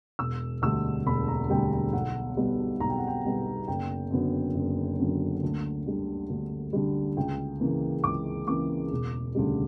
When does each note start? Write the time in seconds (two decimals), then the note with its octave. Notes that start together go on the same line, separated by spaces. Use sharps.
0.19 E1 E6
0.62 D2 D3 G3 E6
1.06 E1 B5
1.28 A#5
1.50 D2 D3 G3 G5
1.72 G5
1.93 B1 F#5
2.37 B2 G3 B3
2.80 B1 A#5
2.90 G5
2.98 F#5
3.07 G5
3.25 B2 G3 B3
3.68 F#1 G5
4.11 F#2 D3 F#3 B3
4.55 F#1
4.98 F#2 D3 F#3 B3
5.43 D2
5.86 D3 G3
6.29 D2
6.73 D3 G3
7.17 C#2 G5
7.60 C#3 E3 A#3
8.04 C#2 D6
8.48 C#3 E3 A#3 D6
8.92 E1
9.35 D2 C#3 G3